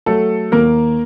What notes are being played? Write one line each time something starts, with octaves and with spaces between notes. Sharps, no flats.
F#3 A3 A4
D#2 A#3 A#4